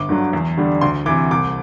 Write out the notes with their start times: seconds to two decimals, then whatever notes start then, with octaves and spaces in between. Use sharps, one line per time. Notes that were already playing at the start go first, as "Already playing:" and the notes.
Already playing: G1 D6
0.09 G2 D3 F#3
0.33 E2
0.57 D3 G3 D4
0.81 D2 C6
1.06 C3 E3 D6
1.31 C2 D6